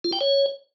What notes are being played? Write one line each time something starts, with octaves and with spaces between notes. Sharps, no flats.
F4
G5
C#5